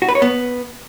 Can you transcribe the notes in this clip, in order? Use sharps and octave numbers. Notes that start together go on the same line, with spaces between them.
F#4
B4
C#5
B3